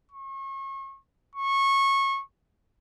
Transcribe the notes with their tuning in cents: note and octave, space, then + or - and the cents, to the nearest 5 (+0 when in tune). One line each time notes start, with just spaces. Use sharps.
C#6 -35
C#6 -20